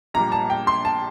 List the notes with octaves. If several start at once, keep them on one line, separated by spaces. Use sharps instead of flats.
A#1 A#2 G3 A#5
A5
G5
C6
A5